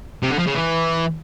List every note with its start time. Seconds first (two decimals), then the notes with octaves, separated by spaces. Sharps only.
0.23 C3
0.31 D3
0.39 F3
0.47 C#3
0.55 E3